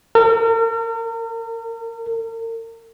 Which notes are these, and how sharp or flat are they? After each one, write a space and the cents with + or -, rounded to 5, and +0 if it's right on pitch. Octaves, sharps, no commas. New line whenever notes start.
A#4 -40